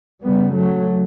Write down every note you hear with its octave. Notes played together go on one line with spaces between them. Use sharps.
F#2 C#3 G3 B3
F#3 A3